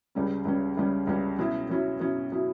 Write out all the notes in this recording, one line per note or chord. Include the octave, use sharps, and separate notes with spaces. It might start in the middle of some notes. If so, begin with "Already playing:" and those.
C#2 C#3 G3 C#4
C#2 C#3 G3 C#4
C#2 C#3 G3 C#4
C#2 C#3 G3 C#4
B2 F#3 C#4 E4
B2 F#3 C#4 E4
B2 F#3 C#4 E4
B2 F#3 C#4 E4